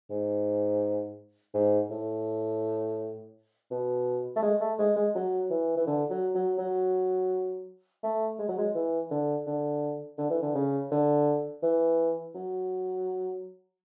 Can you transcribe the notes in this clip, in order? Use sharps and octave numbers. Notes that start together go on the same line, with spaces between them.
G#2
G#2
A2
B2
A3
G#3
A3
G#3
G#3
F#3
E3
E3
D3
F#3
F#3
F#3
A3
G#3
F#3
G#3
E3
D3
D3
D3
E3
D3
C#3
D3
E3
F#3